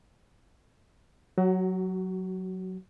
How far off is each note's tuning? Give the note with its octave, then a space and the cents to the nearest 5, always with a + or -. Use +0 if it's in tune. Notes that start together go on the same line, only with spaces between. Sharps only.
F#3 +0 F#4 +30